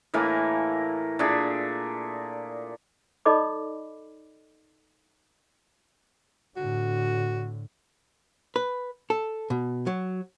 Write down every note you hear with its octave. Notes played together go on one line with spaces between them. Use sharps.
A2 E3 A#3 G#5
A#2 D4 G#4 E5
D#4 A4 D5 D#5 B5 D6
A2 D3 F#4
B4
A4
B2
F#3